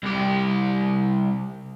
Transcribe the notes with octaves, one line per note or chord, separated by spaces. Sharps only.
C2 G4